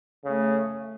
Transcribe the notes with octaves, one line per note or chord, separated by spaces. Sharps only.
C#3 A3